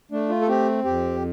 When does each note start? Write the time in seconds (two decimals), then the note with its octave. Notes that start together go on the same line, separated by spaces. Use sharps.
0.11 A3 D4
0.29 F4
0.42 A4
0.48 C4 G4
0.85 F2 G4